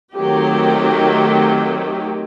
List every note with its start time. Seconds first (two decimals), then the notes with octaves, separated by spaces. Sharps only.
0.15 D#3 F#3 A3 C4 G4